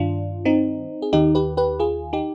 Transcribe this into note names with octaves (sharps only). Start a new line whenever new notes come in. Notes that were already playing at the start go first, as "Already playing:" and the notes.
Already playing: G2 D#3 D4 F4
C4 D#4
G#4
D#2 D#3 D#4 G4
G4 B4
G4 B4
F4 G#4
D#4 G4